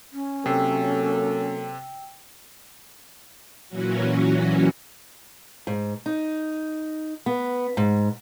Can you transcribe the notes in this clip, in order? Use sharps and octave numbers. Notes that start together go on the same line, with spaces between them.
C#4
C3 F#3 A#3 A4 G5 E6 C7
A#2 E3 F#3 C#4 F#4
G#2
D#4
B3
G#2